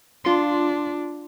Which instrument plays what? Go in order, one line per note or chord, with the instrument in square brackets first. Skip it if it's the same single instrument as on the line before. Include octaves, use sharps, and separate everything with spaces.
[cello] D4 [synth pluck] F4 C6